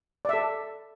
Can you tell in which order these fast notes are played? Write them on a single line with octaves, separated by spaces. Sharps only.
D5 E5 A4